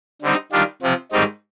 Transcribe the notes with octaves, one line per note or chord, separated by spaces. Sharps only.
D3 G3 C4 D#4
D#3 G3 D4 F4
C3 F3 C4
G#2 D#3 G3 C4 D#4